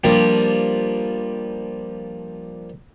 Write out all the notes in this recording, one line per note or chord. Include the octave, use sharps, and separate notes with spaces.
F3 G3 A#3 D4 G4